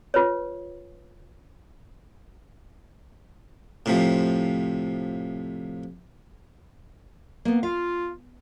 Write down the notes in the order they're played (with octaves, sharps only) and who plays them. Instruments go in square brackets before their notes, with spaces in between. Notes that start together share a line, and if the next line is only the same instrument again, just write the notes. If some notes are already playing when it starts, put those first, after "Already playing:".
[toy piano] F4 B4 C#5
[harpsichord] A2 C3 F3
[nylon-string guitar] A#3 B3
[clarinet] F4 [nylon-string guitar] F5